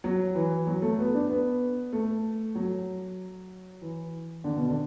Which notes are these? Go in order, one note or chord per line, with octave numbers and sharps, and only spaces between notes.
F#3
E3
F#3
A3
B3
D4
B3
A3
F#3
E3
D3
B2
D3